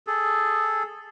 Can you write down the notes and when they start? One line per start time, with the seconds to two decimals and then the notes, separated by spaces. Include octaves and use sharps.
0.07 G#4 A4